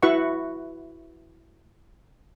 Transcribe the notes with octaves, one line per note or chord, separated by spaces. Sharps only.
E4 F#4 B4 E5 F#5 C#6